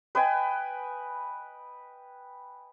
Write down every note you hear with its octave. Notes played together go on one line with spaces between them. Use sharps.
B4 D#5 G5 G#5